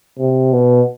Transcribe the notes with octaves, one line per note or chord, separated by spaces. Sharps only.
C3
B2